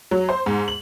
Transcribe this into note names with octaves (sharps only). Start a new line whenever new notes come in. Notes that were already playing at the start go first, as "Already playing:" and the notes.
F#3
C5
G#2
F#7